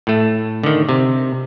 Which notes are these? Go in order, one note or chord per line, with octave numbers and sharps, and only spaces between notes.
A2 A3
D3 D#3
C3